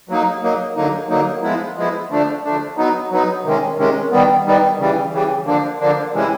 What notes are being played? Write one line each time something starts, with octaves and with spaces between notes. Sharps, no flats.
F#3 A#3 D#4
F#3 A#3 D#4
D3 F#3 A#3 D#4
D3 F#3 A#3 D#4
F3 G#3 B3 E4
F3 G#3 B3 E4
D3 F3 A3 D4
D3 F3 A3 D4
F#3 B3 D#4
F#3 B3 D#4
C3 D#3 G#3 C#4
C3 D#3 G#3 C#4
D#3 G3 B3
D#3 G3 B3
C#3 E3 G3
C#3 E3 G3
D3 F3 A#3 D4
D3 F3 A#3 D4
C3 E3 G#3 C#4 E4